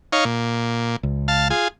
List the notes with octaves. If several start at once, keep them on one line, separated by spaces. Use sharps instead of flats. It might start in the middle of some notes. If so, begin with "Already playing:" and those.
D#4 C#5 F5
A#2
C#2
F5 A5
F4 G#4